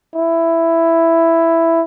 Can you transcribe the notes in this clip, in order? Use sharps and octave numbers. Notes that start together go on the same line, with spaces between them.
E4